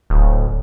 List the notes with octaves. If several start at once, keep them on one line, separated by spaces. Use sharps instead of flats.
D1